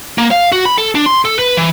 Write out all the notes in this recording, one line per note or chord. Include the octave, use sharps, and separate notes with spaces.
A#3
F5
F#4
B5
A4
D4
C6
A4
B4
E3